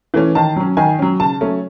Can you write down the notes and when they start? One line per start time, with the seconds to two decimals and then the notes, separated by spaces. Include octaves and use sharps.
0.14 E3 A3 C#4
0.35 D#3 A5
0.56 F#3 C#4
0.77 D#3 G#5
0.99 F#3 C#4
1.20 C#3 A5
1.41 F#3 A3 C#4